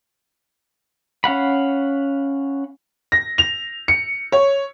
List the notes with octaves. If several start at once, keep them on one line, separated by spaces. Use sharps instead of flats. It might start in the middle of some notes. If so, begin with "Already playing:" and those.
C#4 F5 F#5 B5
A#6
F7
C#7
C#5